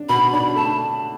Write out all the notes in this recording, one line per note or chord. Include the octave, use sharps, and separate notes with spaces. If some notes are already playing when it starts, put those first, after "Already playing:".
Already playing: D4
B2 B5
D4 B5
A3 A5